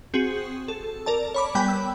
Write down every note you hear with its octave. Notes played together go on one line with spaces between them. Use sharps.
C4 F#4 G#4
A4
A#4 D5 A5
C#5 B5 D6
G3 B3 G5 G#5 B5
E6